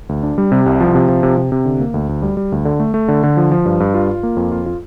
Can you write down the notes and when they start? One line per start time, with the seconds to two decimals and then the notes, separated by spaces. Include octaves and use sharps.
0.09 D2
0.23 D4
0.38 G3
0.52 C3
0.66 C2
0.80 F3
0.95 C3
1.08 F3
1.23 C3
1.38 C3
1.52 C3
1.65 D3
1.80 A#3
1.94 D2
2.09 D2
2.22 G3
2.37 G3
2.52 D2
2.65 D3
2.80 A3
2.94 A3
3.08 D3
3.23 D3
3.37 F3
3.52 F3
3.65 G2
3.80 G2
3.94 F4
4.09 F4
4.23 A#3
4.37 F2
4.52 F4
4.66 F4